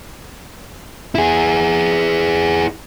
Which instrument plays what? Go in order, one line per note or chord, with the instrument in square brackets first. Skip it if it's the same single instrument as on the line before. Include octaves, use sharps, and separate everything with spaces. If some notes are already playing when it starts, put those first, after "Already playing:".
[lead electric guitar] E4 G#4